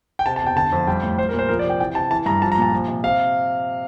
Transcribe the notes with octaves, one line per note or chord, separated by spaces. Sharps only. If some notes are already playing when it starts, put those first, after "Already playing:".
G5
C3 A5
A5
E2 G5
D3 A5
F2
G3 G5
A2
G3 C5
A#4
A#2
C5
F3 A#4
D5
C3
G5
E3 G5
C3 A5
E3 A5
G2 A#5
F3 A5
A#5
A#2 A5
F3
C3
C3 F5